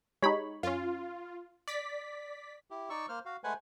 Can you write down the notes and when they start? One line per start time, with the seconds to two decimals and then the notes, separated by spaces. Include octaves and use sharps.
0.22 G#3 D#4 G4 C#5 B5
0.63 F#2 C#4 F4
1.68 D5 B6
2.70 E4 G4
2.90 D#4 D5 C#6 E6
3.09 A#3 C5 F6
3.25 F#4 F5
3.44 G#3 A3 B4 C5 F#5 G#5